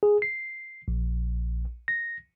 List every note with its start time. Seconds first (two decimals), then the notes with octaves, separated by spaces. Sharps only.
0.03 G#4
0.22 C7
0.88 A#1
1.88 A#6